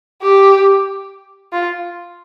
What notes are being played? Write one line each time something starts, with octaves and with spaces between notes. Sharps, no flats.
G4
F4